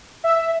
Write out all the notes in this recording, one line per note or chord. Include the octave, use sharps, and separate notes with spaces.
E5